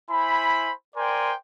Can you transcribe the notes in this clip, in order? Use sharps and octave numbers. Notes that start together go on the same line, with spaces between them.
E4 C5 G#5 B5
A#4 C5 D5 G5 G#5 C6